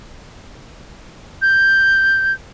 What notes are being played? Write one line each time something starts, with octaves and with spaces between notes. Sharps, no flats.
G6